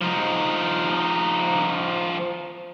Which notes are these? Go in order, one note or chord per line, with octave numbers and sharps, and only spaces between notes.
F3 D#4